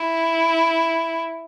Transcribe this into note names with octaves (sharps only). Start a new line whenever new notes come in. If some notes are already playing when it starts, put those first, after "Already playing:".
Already playing: E4